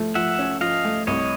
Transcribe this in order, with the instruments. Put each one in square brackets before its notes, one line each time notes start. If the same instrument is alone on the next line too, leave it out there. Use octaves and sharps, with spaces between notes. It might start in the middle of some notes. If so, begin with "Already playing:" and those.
Already playing: [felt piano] F3 A3
[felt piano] F3 [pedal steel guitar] E5 F#5
[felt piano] C#4
[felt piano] F3 [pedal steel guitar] D#5 F5
[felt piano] A3
[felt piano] C2 [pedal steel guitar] C#5 D#5